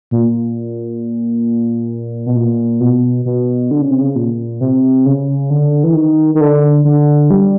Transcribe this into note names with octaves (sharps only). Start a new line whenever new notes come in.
A#2
B2
A#2
B2
B2
D3
C#3
C3
C#3
A#2
C3
C#3
D3
E3
D#3
D#3
D3
D3
G3